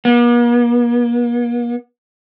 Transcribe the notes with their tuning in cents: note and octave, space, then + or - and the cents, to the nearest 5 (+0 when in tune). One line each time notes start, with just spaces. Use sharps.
A#3 +45